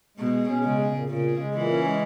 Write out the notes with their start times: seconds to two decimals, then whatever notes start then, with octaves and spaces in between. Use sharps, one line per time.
0.17 B2 G#3
0.33 G#4
0.48 C#4
0.62 C#3 G#3
0.78 G#4
0.94 A#2
1.08 A#2 C#3
1.24 G#4
1.38 G#3
1.54 A#2 E3
1.69 C#4
1.84 G#3